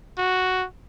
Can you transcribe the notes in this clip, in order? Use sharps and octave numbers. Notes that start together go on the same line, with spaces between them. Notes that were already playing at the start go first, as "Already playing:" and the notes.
F#4